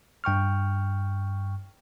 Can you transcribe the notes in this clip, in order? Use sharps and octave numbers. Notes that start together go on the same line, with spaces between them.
G2 G5 C#6 F6